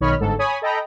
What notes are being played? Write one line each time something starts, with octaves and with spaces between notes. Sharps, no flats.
B1 D#3 C#5 D#5 B5 F6
G1 G#2 A4
C#5 G#5 B5 D#6
A4 D#5 G5 A#5 B5